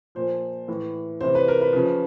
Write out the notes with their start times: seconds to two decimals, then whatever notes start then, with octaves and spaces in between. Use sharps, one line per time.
0.15 A#2 F3 C5
0.68 A2 E3
1.21 C3 E3 C5
1.35 B4
1.48 A#4
1.61 B4
1.73 C#3 F3